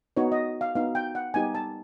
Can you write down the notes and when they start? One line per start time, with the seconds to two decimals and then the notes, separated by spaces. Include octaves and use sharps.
0.17 B3 D#4 F#4 C#5
0.32 D#5
0.61 F5
0.75 B3 D#4 F#4 F5
0.95 G5
1.15 F#5
1.34 G3 B3 D#4 G4 G#5
1.55 A5